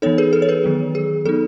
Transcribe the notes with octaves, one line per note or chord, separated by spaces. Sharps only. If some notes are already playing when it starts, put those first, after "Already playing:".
E3 B3 D#4 A4 C#5
G#4 B4
A4
C#5
G#4 B4
D#3 F#3 B3
G#4
F#3 B3 D#4 A4